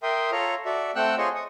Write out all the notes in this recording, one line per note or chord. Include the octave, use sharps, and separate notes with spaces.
A#4 E5 G5 C6 D#6
F4 A4 C#5 A#5
F#4 A4 D5 E5
A3 C4 F#5 G5 E6 F#6
F4 G#4 C5 C#5 D#5 C#6
C#6 D#6